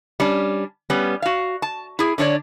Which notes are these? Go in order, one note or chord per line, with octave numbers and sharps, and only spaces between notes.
G3 C#4 D4
G3 B3 C#4
F#4 F5
A5
E4 G#4
D3 D4 C#5 D5